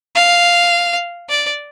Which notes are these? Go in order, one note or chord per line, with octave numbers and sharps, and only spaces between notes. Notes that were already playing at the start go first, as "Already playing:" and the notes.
F5
D5